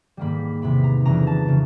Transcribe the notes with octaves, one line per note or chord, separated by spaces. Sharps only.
G#2 D#3 G3 A#3 B5
E2 C3 D#3 B5
A#5
F2 C#3 E3 G3 A#5
A5
C#3 E3 G#3